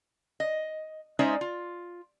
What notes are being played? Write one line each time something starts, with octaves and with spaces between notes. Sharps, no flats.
D#5
G#3 C#4 D#4 C5 D5 E5
F4